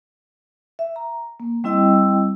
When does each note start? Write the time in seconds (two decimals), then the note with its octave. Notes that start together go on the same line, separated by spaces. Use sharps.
0.79 E5
0.96 A#5
1.40 A#3
1.64 G3 C4 E4 D#5 G5 E6